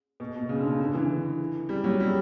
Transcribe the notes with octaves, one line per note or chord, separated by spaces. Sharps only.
B2
B2
C#3
D3
C#3
D3
E3
G3
F#3
G3